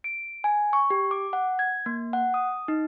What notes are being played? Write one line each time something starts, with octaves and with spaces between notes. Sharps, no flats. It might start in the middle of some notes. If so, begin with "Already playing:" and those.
D7
G#5
C#6
G4
D6
F#5
G#6
A#3
F#5
D#6
D#4